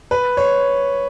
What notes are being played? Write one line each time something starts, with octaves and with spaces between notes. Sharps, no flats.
B4
C#5